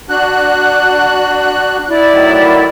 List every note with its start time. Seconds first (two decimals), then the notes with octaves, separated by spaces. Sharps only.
0.09 D4 F#4 F#6
1.89 E4 D5
2.13 A2 D#3 F#3